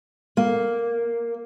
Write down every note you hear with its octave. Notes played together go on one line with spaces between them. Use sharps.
A#3